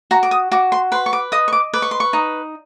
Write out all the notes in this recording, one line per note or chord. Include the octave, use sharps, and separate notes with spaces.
F#4 A#5
D6
D#6
F#4 D6
C6
B4 C6
C#6
D6
D#5 D#6
C#6
D6
B4 D6
C#6
C6
C#6
D#4